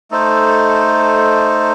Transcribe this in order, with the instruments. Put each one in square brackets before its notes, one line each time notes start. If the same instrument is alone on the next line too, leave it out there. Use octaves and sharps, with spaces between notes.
[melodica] A3 D#4 A4 C5